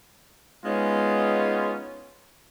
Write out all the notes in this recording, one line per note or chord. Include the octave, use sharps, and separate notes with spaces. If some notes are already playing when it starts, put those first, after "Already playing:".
G#3 B3 C#4 D#4 F4